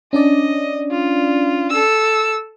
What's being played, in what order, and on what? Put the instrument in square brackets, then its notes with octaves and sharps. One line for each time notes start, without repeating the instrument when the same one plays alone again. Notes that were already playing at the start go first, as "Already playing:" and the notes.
[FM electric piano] C#4 D4 D5 [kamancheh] D#5
[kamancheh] F4
A4 E6